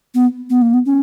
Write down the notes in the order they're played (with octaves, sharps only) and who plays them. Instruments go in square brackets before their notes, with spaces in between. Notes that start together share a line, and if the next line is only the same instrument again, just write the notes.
[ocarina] B3
B3
A#3
B3
C#4